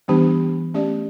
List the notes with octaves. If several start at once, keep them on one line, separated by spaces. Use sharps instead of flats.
E3 G3 B3 D4 G4
A3 C#4 G4 D5